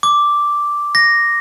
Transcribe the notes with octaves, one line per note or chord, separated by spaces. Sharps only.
D6
A#6